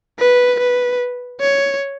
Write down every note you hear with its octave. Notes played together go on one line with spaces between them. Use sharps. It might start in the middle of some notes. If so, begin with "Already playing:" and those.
B4
B4
C#5